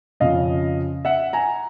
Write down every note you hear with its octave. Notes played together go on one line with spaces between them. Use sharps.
F2 C#3 F3 D#5 F5
E5 F#5
G#5 A#5